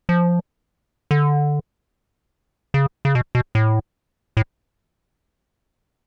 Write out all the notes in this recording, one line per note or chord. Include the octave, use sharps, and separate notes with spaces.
F3
D3
C#3
C#3
B2
B2
A2
A2